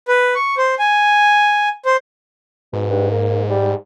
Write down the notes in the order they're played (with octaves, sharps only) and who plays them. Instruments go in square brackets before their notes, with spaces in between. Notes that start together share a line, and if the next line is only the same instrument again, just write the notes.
[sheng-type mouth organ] B4
C#6
C5
G#5
C5
[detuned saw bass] G#2 [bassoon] B2
[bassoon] G2
A#3
G3